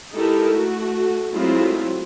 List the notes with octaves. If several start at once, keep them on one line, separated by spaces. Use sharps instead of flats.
G#3 D#4 E4 G4 A4 A#4
A3 F#4
F#3 G#3 A3 C4 E4 F4